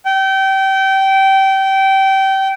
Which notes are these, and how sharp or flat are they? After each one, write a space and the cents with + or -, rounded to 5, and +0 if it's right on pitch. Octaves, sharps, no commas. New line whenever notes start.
G5 -25